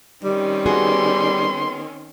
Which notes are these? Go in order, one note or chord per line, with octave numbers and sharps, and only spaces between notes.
D#3 G3 C4 C#4
B3 F#4 G#4 C6